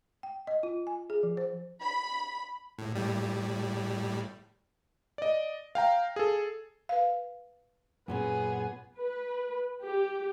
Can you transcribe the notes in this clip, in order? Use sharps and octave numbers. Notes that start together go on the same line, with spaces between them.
G5
D#5
F4
G#5
G#4
F3
C5
B5
A2
A2 G3
D5 D#5
F5 G5 A#5
G#4 A4
B4 F5
F#2 A#2 B3 C#4 G#4
B4
G4